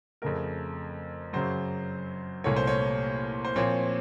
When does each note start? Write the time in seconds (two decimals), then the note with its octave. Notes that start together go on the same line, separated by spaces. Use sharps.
0.22 F2 C#3 A3 A#4
1.33 F#2 C#3 F#3 C5
2.44 C2 A#2 A3 C#5
2.56 C5
2.67 C#5
3.45 C5
3.56 A#2 F3 C4 C#5